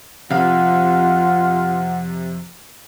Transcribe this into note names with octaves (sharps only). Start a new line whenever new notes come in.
F2 C3 F4 F5 F#5